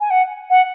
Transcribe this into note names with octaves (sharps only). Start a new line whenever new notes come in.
G#5
F#5
F#5